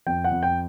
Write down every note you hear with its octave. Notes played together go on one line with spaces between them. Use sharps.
F2 G5
F#5
F2
G5